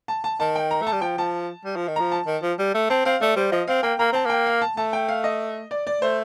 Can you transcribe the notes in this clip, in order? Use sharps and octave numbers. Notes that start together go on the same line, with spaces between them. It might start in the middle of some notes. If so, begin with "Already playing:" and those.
A5
A5
D#3 A5
G5
A#5
A3 A5
G3
F3 G5
F3 A5
G3
F3
D#3
F3 A#5
A5
D#3
F3
G3
A3
C4 A5
C4 F5
A3 D5
G3 C5
F3 D#5
C4 F5
A#3 G5
A#3 A#5
C4 A5
A#3 G5
F5
A5
A3 A5
G5
F5
D#5
D5
D5
A3 C5